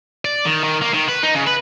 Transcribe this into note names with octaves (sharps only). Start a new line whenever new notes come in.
D5
D#3
D#3
A#3
D#3
B4
D#4
C#3
B4